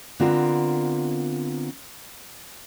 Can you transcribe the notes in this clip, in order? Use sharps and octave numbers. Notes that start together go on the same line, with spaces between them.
D3 B3 C4 F4 A#4